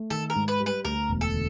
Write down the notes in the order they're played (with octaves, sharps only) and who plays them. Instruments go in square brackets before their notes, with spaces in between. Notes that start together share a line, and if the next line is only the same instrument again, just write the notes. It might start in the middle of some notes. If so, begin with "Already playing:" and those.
Already playing: [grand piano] A3
[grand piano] D#3 [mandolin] A4
[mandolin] A#4
[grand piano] G#2
[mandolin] B4
[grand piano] G3
[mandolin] B4
[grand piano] D2 [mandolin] A#4
[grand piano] E1
[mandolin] A4
[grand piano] D3